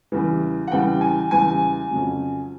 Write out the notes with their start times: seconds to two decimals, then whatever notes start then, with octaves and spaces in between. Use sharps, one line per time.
0.12 E2 C#3 E3 G3
0.67 F#5
0.71 E2 C#3 E3 G3 G5
1.01 G#5
1.31 E2 C#3 E3 G3 G#5
1.91 F2 C#3 F#3